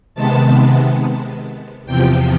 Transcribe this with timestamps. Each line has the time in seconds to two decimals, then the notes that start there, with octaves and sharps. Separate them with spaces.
0.15 C3 D#3 G#3 B3 A5
1.86 E2 C3 F3 G5